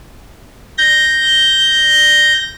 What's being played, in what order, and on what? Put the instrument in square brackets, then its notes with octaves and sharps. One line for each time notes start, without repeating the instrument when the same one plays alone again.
[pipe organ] G6 A#6